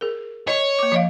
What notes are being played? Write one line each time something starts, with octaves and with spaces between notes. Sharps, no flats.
G#4 A#4
C#5 D#5
A#3 D6
F3 D#5 F5